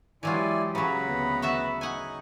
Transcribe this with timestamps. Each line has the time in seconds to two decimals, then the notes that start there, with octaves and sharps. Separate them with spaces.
0.23 E3 F#3 G#3 E4 F4 G4 D5 G#5
0.75 C#3 F#3 B4 F#5 A#5 B5
1.04 D2 B3
1.42 F#4 E5 A5
1.81 D#4 F#5 G#5 C#6